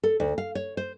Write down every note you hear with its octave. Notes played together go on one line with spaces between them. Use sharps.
A4
D2
F5
C#5
C5